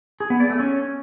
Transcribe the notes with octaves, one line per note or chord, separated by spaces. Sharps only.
G#4
B3
D5
A3
C#4